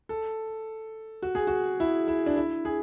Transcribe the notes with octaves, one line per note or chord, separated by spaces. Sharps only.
A4
F#4
G#4
F#4
E4
E4
D4
E4
G#4